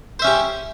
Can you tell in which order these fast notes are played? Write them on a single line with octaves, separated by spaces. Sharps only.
C5 E5 C#4 G4